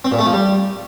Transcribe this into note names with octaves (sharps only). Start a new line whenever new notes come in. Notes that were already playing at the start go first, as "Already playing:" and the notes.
C4
A#2
A3
F3
G3